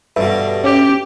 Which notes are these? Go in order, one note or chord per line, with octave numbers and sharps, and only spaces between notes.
G2 B2 A4 B4 E5
C#4 G4